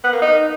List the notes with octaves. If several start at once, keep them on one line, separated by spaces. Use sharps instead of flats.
B3
A#3
D#4